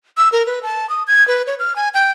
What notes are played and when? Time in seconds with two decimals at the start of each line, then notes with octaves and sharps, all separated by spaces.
0.17 E6
0.32 A#4
0.46 B4
0.63 A5
0.90 D#6
1.07 G#6
1.28 B4
1.47 C#5
1.59 F6
1.76 G#5
1.94 G5